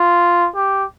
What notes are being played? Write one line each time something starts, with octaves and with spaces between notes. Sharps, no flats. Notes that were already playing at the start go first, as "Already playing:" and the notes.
Already playing: F4
G4